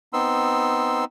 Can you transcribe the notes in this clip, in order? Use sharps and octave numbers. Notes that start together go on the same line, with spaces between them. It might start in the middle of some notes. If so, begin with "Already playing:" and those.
B3 C4 D#4 C6 E6